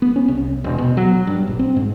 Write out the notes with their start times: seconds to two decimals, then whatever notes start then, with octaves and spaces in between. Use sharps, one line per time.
0.02 B3
0.16 C#4
0.28 C2
0.64 E1
0.78 B2
0.97 F#3
1.27 G2
1.48 A#1
1.59 C4
1.76 G#2